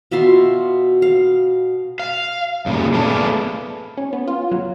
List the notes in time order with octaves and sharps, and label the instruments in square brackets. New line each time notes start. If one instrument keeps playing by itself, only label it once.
[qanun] B2 F4 E5 C6
F5
[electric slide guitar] F5
F#2 A#2 C#3 G3
A3 B3 G#4 A4 D5 F5
[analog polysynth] C#4
B3
F4
F#3